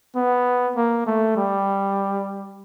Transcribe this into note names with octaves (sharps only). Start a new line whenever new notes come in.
B3
A#3
A3
G3